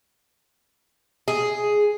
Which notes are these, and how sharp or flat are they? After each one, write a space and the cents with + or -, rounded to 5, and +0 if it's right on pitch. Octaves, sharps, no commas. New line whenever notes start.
G#4 +5